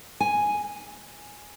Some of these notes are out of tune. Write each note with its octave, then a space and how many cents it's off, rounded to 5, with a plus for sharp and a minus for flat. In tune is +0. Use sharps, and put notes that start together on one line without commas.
G#5 +0